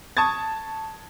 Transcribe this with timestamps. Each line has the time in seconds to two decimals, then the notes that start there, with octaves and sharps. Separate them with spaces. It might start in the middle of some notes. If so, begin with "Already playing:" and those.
0.17 A5 C#6 D#6 G#6 A6